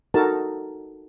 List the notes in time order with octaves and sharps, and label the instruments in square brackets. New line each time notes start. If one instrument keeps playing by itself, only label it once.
[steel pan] D#4 F#4 A4 A#4 A5